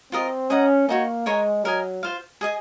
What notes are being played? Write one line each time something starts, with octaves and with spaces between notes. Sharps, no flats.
C4 F4 A#4 D#5
C#4 G#4 D#5 F#5 A#5
A#3 D#4 F#4 C#5
G#3 A#4 C#5 G#5 C6
F#3 A#4 D#5 G#5
F4 C5 F5
G#4 D#5 G#5